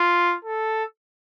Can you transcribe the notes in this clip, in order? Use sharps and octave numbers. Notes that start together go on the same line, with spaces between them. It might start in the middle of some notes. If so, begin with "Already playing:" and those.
Already playing: F4
A4